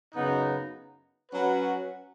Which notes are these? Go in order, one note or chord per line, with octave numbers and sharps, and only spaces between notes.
F#2 C#3 B3 D#4
F#3 C#4 F#4 B4